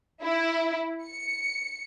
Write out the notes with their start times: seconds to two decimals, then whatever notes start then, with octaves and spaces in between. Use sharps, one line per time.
0.22 E4
1.05 C#7